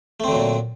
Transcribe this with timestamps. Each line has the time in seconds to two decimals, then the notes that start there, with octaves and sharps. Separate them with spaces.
0.20 A3
0.24 C4
0.28 D3
0.32 F#3
0.36 A#2